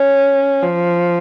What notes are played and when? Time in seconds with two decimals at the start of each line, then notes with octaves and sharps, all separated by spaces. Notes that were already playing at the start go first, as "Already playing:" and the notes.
Already playing: C#4
0.63 F3